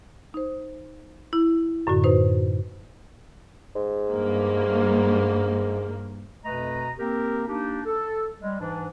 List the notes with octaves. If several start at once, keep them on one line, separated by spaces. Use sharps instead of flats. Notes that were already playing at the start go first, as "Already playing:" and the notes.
D#4 C5
E4
F#2 A2 D3 F#4
D#4 B4 C5
G#2
G2 A#3
F2 B2 A3 B4 D#5 A#5
A#3 C4 G4 A#4
A#3 D4 D#4 G4
A4
G3 G#3
G#2 E3 D4